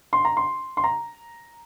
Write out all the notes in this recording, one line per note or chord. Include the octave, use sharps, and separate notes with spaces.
C6
A#5
C6
C6
A#5